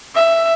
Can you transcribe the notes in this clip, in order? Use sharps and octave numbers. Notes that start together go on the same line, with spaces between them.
E5